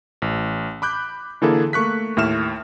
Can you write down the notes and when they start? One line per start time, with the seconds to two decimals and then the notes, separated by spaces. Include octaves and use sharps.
0.22 A1
0.82 B5 D6 F#6 G6
1.42 D3 E3 A#3 E4 G#4 A4
1.73 A3 A#3 C#6 F#6 B6
2.17 D#2 A2 E5 F6 E7